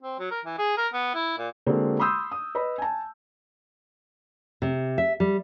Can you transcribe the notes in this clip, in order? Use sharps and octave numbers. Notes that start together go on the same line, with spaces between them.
C4
F#3
A#4
E3
G#4
A#4
B3
E4
A#2
D3 G#3 A#3 C4 F#4
B5 C6 D#6 E6 G6
D#6
B4 D#5 B5
G#5 A5
C3
E5
G3